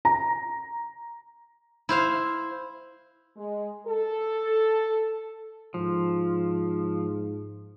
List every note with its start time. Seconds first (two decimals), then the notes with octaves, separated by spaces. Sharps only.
0.05 A#5
1.89 E4 C5 F5
3.37 G#3
3.87 A4
5.74 G#2 F3